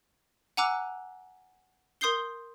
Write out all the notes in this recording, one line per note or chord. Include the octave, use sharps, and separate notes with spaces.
F#5 G#5 A#5 D6 E6 F#6
A#4 C6 D#6 G6 C7 G7